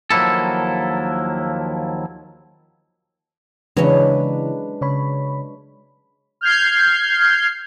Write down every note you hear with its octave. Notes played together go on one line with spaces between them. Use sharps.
D#2 F3 F#3 A#3 E4 A4
C#3 E3 F#3 G#3 C#4 D4 E4 B4
C#3 C#5 B5
F6 G6 G#6 C7